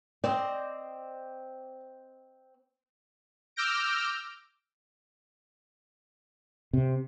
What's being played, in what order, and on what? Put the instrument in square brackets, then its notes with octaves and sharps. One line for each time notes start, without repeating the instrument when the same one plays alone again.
[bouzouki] C4 C5 D#5 [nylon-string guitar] D5
[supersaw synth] D6 E6 F6 G6 A#6 D7
[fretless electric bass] C3